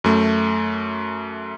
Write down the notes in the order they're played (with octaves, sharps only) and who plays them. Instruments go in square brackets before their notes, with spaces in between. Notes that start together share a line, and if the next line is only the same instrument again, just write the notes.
[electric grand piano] F#2 A3